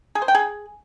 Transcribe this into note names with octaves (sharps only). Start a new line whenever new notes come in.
G#4
C5
G5
G#4